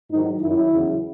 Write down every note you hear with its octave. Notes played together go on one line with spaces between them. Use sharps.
G#2 D#3 F#3 D#4
F#2 D#3 F#3 E4
E2 C#3 F#3